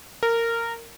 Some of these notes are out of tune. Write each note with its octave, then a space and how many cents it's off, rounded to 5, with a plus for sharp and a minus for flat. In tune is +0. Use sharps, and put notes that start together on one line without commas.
A#4 -15